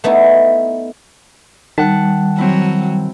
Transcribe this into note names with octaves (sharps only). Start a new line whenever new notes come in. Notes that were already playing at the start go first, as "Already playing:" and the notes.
A3 B3 D#4 E4
D#3 G3 F#5 A5
F#3 C4 E4